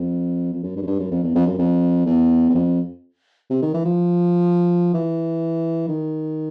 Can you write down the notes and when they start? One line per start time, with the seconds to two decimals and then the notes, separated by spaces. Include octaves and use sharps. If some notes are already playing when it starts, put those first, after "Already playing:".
Already playing: F2
0.53 F2
0.63 F#2
0.76 G2
0.82 F#2
0.87 G2
1.00 F#2
1.11 F2
1.23 E2
1.35 F2
1.47 F#2
1.58 F2
2.06 E2
2.49 E2
2.55 F2
3.50 C3
3.62 D#3
3.74 E3
3.85 F3
4.94 E3
5.88 D#3